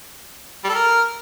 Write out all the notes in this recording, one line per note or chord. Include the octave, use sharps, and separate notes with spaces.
G3
A4
A#4